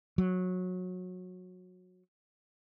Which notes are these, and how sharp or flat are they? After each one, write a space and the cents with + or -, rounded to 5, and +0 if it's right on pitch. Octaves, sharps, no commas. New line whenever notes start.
F#3 -20